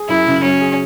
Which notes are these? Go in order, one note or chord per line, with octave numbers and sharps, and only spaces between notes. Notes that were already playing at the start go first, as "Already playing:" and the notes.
Already playing: G#4
F#2 E4
C#3
F#3 C#4
G#4